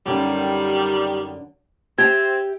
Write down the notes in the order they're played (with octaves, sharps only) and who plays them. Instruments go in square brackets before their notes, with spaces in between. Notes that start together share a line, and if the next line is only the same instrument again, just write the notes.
[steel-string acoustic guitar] F#2 D3 [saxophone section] D#3 G3
[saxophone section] C4 [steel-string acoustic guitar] G4 E5 G5 [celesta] G#6